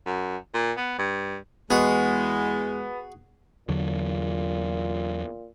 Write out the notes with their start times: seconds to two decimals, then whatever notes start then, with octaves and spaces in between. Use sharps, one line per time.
0.06 F#2
0.54 A#2
0.77 B3
0.98 G2
1.70 E2 G#3 B3 F#4 G#4
3.69 E2 A#2 D3 F#3